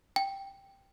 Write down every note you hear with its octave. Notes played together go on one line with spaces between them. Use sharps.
G5